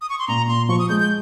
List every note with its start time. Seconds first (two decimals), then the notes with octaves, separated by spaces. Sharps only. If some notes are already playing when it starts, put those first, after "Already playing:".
0.01 D#6
0.10 C#6
0.19 C6
0.28 A#2 A#5
0.48 A#2 C6
0.69 F3 C#6
0.79 D#6
0.89 G#3 G6
1.00 G6